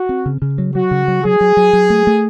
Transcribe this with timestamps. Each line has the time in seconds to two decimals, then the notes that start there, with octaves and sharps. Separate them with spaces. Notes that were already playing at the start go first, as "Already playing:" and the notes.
Already playing: F#4
0.09 C4
0.26 C#3
0.42 C#3
0.58 F#3
0.75 F#3 F#4
0.91 C#3
1.08 F#3
1.25 F#3 G#4
1.41 F#3
1.57 F#3
1.73 F#3
1.90 A3
2.07 A3